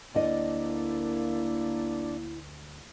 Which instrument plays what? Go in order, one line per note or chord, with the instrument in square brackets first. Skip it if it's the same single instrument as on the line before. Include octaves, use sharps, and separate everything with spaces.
[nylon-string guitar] D2 D5 D#5 [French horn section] A#3 [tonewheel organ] D4 [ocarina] E4